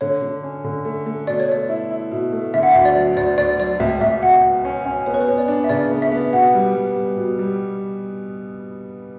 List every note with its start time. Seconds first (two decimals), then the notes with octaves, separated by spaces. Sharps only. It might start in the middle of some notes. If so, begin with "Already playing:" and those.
0.01 D3 C#5
0.22 D3
0.43 C#4
0.64 D3
0.85 A3
1.06 A3
1.27 B2 D5
1.40 C#5
1.49 A3 D5
1.69 E4
1.90 E4
2.11 B2
2.33 A3
2.54 D3 E5
2.63 F#5
2.71 D2 E5
2.85 D5
2.96 F#3
3.17 D2 D5
3.38 D2 D5
3.59 F#3 D5
3.80 C#2 E5
4.01 C#2 E5
4.22 B2 F#5
4.44 B2
4.65 C#4
4.85 C#4
5.06 B3 C#5
5.14 B4
5.22 C#5
5.28 B3
5.38 D5
5.48 D4
5.64 E5
5.69 C#3 D5
5.90 B3
6.02 E5
6.12 B3
6.33 B2 F#5
6.54 G3
6.75 G3
6.96 G3
7.17 B2
7.39 G3